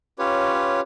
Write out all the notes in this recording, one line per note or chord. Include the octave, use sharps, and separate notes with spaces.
C#4 F4 G4 B4 C#5